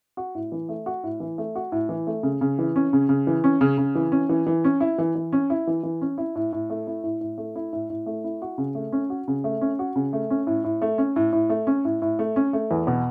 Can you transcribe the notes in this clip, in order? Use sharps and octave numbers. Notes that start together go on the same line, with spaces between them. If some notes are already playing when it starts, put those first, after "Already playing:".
F#4
A2
E3
A3
F#4
A2
E3
A3
F#4
A2
E3
A3
C#3
C#3
E3
C#4
C#3
C#3
E3
C#4
C#3
C#3
E3
C#4
E3
E3
C#4
E4
E3
E3
C#4
E4
E3
E3
C#4
E4
A2
A2
A3
E4
A2
A2
A3
E4
A2
A2
A3
E4
F#4
C#3
A3
C#4
F#4
C#3
A3
C#4
F#4
C#3
A3
C#4
A2
A2
A3
C#4
A2
A2
A3
C#4
A2
A2
A3
C#4
A3
E2
B2